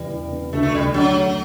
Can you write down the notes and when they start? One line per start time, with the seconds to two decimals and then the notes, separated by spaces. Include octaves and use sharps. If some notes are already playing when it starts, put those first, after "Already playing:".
Already playing: E2 E3 G3 B3
0.12 E3
0.32 B3
0.53 D2 A3
0.63 A3
0.74 D2 G3
0.94 F#3 D4
1.15 A3